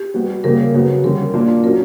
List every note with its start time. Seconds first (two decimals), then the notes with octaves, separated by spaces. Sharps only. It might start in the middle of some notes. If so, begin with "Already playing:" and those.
Already playing: G4
0.14 G3 B3 F#4
0.44 C#3 G3 A#3 A#4
0.74 C#3 F#3 B3 F#4
1.04 D3 G3 C#4 A#4
1.34 A#2 A#3 D4
1.63 B2 F#3 C#4 A#4